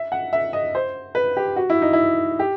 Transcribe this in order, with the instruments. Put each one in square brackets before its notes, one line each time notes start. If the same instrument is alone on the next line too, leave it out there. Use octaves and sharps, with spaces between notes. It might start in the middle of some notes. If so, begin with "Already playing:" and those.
Already playing: [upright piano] E5
F#5
E5
D#5
C5
B4
G4
F#4
E4
D#4
E4
G4